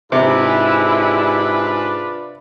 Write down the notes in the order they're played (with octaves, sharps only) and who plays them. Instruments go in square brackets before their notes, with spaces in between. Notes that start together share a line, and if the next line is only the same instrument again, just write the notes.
[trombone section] G#2 G4 G#4 [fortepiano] C3 [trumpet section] D4 F4 B4 [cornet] E4